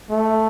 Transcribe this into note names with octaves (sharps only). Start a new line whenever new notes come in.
A3